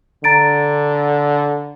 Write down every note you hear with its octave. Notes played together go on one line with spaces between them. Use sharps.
D3 A#5 A6 D7